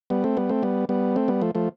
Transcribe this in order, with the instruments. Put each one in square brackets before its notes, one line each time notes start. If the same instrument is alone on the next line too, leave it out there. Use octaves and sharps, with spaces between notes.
[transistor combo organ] G3 B3
A3 C4
G3 B3
A3 C4
G3 B3
G3 B3
A3 C4
G3 B3
F3 A3
F3 A3